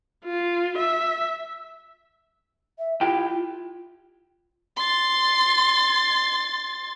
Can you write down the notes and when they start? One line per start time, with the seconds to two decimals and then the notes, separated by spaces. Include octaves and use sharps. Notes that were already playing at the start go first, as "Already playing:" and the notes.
0.25 F4
0.78 E5
2.79 E5
3.01 E4 F4 G4 G5
4.76 C6 A6